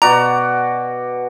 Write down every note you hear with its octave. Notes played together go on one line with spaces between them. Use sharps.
B2 F#4 D5 A#5